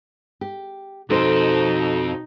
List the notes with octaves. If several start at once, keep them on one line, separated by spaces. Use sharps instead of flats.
G4
F2 B2 C4 D#4 A4 C5